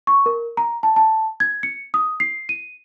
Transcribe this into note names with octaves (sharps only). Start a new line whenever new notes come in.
C#6
A#4
A#5
A5
A5
G#6
C#7
D#6
C7
D#7